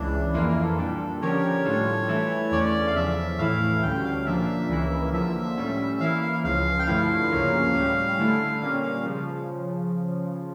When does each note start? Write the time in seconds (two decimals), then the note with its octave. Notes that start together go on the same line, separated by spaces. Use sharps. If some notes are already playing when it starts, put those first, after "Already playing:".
Already playing: C#2 C#3 E3 D4
0.33 F2 E3 A#3 E4 F4
0.49 F4
0.63 A4
0.78 A#2 G3 D4
1.21 D3 F3 C#4 G4 A#4 C#5
1.65 A2 G3 D4 F4 A4
2.08 E3 A3 E4 A4
2.51 E2 D3 A3 C#4 D5
2.87 F5
2.95 E2 C#3 F3 E5
3.38 A2 E3 A3 E4 F5
3.83 D2 D3 G3 C#4 G5
4.04 F5
4.26 A#2 F3 A#3 D4 E5
4.69 C#2 C#3 E3 A#3 E4
5.12 D3 F3 A#3 E5
5.57 A2 G3 C#4
6.00 E3 A#3 E4 F5
6.22 F5
6.43 C#2 C#3 F3 F5
6.79 G5
6.87 G2 D3 F3 A3 E4 F5
7.31 D2 C#3 F3 A#3 C#4
7.74 A2 G3 C#4 G4
8.18 D3 A3 E4 A4
8.61 A#2 G3 A#3 C#4 F5
8.83 F5
9.05 C#3 F3